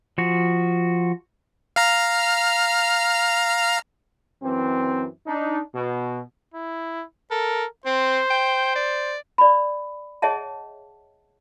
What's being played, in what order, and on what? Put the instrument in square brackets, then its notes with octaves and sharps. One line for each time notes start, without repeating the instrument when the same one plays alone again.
[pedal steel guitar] F3 F#4
[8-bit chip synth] F5 A#5 F6
[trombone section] F#2 E3 C4
D4 D#4
B2
[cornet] E4
[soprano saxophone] A4 [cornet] A#4
[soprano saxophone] C4 [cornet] C5
[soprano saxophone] G5
D5
[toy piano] D5 B5
G#4 C#5 D#5 E5 F#5 A5